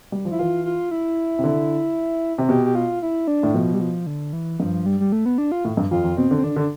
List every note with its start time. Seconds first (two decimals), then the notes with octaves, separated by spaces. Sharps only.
0.12 G3
0.25 F3
0.31 E4
0.39 E3 F4
0.65 F4
0.91 E4
1.39 C3
1.44 D3
2.38 C3
2.49 B2 G4
2.66 G4
2.75 F4
3.02 E4
3.28 D4
3.43 A2
3.54 B2 F3
3.74 G3
3.80 F3
4.07 D3
4.33 E3
4.60 G2 F3
4.86 G3
5.00 G3
5.12 A3
5.26 B3
5.38 D4
5.52 F4
5.65 A2
5.77 G2
5.91 F2 F4
6.04 F2
6.17 B2 C4
6.31 D3
6.38 C4
6.43 D3 D4
6.56 D3